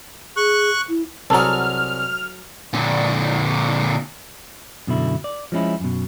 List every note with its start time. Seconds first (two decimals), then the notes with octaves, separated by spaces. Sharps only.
0.37 G#4 C#6 F#6
0.89 E4
1.30 C2 F#3 G#4 A4 A5 A#5 F6
2.73 A#2 D3
4.87 F#2 B2 D3 E4
5.24 D5
5.52 F3 G#3 C#4 E4
5.80 F#2 B2